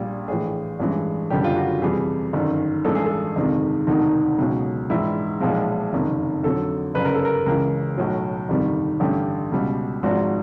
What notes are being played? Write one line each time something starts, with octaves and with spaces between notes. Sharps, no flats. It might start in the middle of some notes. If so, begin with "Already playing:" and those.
Already playing: A#1 A#2 G3
A#1 A2 E3 G#4
A1 G2 E3 G#3
F#1 F#2 D3 G3 G4
F4
F#4
F2 C3 E3 G3 G#4
G1 F#2 D#3
A1 G2 E3 G#3 A4
G#4
A4
G1 F2 C3 D#3 G#3
E1 D2 C3 D#3 D#4
C#2 B2 F#3
A#1 G#2 E3 E4
B1 A#2 F3 G#3
F#1 F2 C3 D#3
F2 D3 F#3 A4
G1 F#2 C#3 B4
A#4
A4
A#4
C#2 C#3 E3 A#4
B1 A2 F#3
G1 F2 C3 D#3 G3
A1 G2 D3 G4
C#2 B2 G3
G#1 G#2 F3 F#4